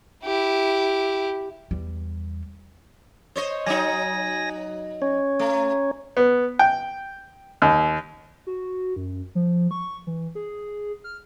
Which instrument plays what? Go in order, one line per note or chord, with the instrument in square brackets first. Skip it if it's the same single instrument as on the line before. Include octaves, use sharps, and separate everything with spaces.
[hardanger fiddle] E4 G4
[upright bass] E2 G3
[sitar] C5 C#5 D#5
[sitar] F#3 D#4 [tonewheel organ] G#5 A#6
[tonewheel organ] C#4 C#5
[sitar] A3
[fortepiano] B3
G5
D#2
[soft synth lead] F#4
F#2
F3
C#6
E3
G#4
F6